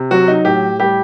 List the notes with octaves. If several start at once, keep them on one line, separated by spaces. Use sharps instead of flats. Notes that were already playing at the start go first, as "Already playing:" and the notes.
Already playing: C3
F#3 F#4
D#4
A2 G4
G3 G4